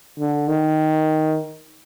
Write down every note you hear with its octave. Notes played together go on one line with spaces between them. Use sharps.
D3
D#3